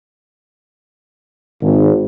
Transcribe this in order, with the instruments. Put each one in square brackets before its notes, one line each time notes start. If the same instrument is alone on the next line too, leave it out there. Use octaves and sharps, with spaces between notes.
[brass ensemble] G#1